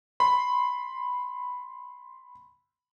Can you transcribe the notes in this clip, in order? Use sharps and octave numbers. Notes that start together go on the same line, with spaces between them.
B5 C6